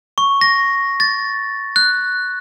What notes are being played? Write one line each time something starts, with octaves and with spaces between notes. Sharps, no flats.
C#6
A#6
A6
F#6